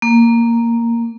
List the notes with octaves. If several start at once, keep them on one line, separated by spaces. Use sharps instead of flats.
A#3